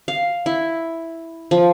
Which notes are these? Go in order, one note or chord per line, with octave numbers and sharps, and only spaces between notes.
F5
E4
F3